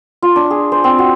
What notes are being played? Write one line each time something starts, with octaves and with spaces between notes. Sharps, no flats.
F4
D4
G#4
C5
C4
F#4